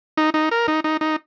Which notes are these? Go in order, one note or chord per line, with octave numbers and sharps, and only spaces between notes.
D#4
D#4
A#4
D#4
D#4
D#4